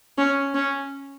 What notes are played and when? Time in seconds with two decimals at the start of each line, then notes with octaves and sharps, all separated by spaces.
0.18 C#4
0.54 C#4